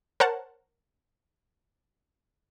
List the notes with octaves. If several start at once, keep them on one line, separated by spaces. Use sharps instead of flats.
A#4 C5 C#5 F#5 A5